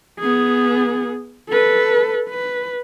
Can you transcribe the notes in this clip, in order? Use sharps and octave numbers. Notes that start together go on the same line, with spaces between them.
B3 G#4
A4 B4
B4